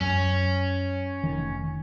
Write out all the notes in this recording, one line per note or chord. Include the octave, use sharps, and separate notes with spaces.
F#2 C#4
F1 D#3